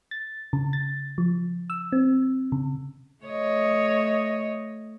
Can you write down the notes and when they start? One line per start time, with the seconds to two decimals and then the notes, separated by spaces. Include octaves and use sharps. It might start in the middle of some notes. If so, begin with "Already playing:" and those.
0.11 A6
0.53 C#3
0.73 A6
1.18 F3
1.70 E6
1.92 C4
2.52 C#3
3.25 A3 C#5 D#5